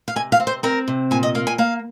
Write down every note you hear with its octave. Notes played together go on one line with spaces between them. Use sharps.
F5
C3 G#5
F5
C4
C5
C4 A#4
C3
A#2 G#5
D#5
A#3 F5
G#5
A#3 F5